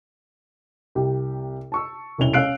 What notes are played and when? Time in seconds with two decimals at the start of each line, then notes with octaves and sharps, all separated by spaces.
0.95 C2 G4
1.72 A5 C#6 E6
2.18 E1 C2 C#4 E4 F7 G7
2.33 C#4 F5 E6 F#6 C7 D7